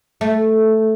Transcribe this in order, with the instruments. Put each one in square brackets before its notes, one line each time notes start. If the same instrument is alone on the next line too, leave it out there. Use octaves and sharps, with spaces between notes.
[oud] A3